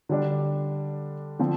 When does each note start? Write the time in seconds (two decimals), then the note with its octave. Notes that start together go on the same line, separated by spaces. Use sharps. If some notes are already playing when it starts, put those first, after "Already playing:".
0.09 D3 G3 D4
1.39 D3 F3 C4